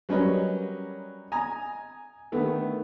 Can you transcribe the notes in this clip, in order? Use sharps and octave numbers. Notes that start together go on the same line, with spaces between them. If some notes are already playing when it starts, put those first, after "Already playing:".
F#3 G3 C#4 A#4 B4 D#5
G#5 A#5 D#6
D3 D#3 A3 B3